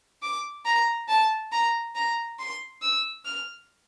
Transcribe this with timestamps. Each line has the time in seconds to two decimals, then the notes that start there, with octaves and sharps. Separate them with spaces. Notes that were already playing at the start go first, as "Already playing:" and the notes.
0.23 D6
0.66 A#5
1.09 A5
1.52 A#5
1.95 A#5
2.39 C6
2.82 E6
3.25 F6